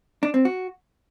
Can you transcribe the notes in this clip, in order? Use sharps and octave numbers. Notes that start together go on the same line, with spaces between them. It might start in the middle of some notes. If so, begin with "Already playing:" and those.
D4
C4
F#4